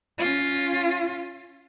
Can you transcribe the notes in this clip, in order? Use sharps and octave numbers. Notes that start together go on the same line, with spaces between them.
C#4 F4